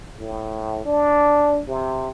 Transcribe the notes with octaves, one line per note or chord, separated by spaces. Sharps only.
A2
D4
C3